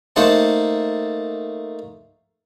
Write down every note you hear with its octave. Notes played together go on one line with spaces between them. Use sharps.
A3 A#3 D#4 C5 F#5 A5